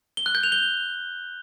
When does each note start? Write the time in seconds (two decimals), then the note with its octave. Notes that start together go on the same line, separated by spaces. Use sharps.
0.17 G7
0.26 F#6
0.35 G6
0.43 F7
0.52 G7